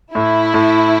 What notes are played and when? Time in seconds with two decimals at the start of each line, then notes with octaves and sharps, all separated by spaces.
0.14 A2 E4
0.54 A2